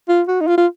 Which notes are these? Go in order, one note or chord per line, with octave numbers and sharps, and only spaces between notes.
F4
F#4
D#4
F4
F4